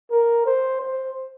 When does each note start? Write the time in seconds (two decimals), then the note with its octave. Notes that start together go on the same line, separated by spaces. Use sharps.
0.11 A#4
0.46 C5
0.81 C5